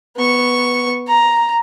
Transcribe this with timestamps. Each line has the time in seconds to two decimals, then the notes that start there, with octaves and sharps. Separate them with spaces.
0.16 B3 C#6
1.08 A#5